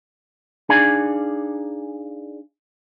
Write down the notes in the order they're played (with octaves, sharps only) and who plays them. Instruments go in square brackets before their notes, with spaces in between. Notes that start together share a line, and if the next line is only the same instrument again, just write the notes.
[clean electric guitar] D4 D#4 G#4 D5 F5 G#5